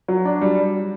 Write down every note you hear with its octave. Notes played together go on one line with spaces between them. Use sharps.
F#3
D4
G3